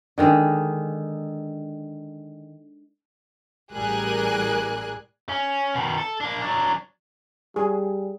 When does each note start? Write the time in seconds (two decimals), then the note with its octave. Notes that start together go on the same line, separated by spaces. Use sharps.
0.18 D3 D#3 G#3
3.73 A1 G3 G#4 A#4 G#5 F#6
5.29 C#4
5.75 B2 D#3
5.98 A4
6.20 A#3 D4
6.42 F#3 D4
7.56 G3 G#4